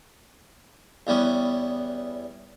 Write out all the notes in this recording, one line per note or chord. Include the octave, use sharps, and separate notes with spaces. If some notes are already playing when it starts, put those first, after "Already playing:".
E2 G3 B3 C#4